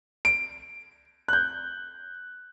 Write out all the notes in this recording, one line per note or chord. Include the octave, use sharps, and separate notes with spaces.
D7
F#6
G6